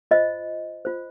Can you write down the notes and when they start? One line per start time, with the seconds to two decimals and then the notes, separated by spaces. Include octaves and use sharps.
0.11 F4 C5 D#5
0.85 F4 C5